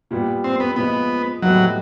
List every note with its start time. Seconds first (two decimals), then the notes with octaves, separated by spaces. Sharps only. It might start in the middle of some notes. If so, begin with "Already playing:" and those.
0.11 A#2 G3 B3
0.44 C4
0.60 B3
0.76 A#2 F3 G#3 B3
1.42 A2 E3 F#3 G3 B3 D#4